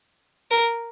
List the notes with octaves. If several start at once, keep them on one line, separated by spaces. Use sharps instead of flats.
A#4